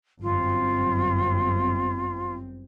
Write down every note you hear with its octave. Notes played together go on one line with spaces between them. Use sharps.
G1 F#2 C4 F4